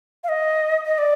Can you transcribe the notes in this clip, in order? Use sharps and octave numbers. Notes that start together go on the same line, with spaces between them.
F5
D#5
D#5
D5